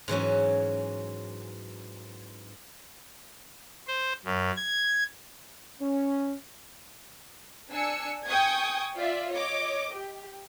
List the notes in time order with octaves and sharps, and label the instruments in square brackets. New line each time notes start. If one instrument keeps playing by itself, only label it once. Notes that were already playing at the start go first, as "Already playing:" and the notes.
[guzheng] G#2 E3 F#3 C#4
[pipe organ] C5
F#2
G#6
[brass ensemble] C#4
[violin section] D4 G#5 E6 C#7
G5 G#5 C#6 D#6 G#6
F4 D5 E5
C#5 D#5 D6
G4